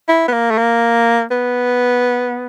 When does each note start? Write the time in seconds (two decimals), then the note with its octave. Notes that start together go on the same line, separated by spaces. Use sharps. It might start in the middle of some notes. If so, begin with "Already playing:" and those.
0.09 E4
0.28 B3
0.33 A#3
0.51 A3
0.58 A#3
1.31 B3